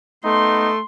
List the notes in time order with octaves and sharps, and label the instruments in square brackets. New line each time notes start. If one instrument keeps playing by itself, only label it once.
[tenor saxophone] A3 [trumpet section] B3 D#4 [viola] C6